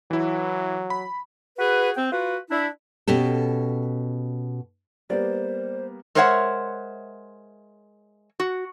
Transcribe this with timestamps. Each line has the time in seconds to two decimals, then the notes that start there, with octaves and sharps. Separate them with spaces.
0.11 E3 F#3 E4
0.90 B5
1.58 F#4 G#4 B4
1.96 C4 G5
2.12 F4 F#4 B4
2.50 D4 E4
3.07 B2 C#4 G4 A4
5.10 G3 A#3 B3 C5 D5
6.15 G#3 A#4 C5 C#5 E5 F#5
8.40 F#4